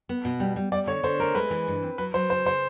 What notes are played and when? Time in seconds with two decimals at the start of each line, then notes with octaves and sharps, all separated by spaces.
0.09 B3
0.25 B2
0.40 G3
0.56 G3
0.72 G3 D5
0.87 D3 C#5
1.03 D3 C5
1.19 A3 A#4
1.35 G#3 B4
1.50 E3
1.67 G2
1.83 C4
1.98 F#3 B4
2.14 F#3 C5
2.30 C#3 C5
2.45 C#3 C5